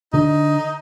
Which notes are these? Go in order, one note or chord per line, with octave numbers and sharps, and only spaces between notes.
D3 D#4